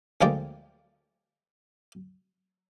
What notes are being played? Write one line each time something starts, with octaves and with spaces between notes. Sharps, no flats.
D2 F3 G#3 A#3 D5 G5